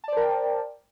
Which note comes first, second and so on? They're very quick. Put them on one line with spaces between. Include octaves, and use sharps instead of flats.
A5 D5 C5 A#4 G5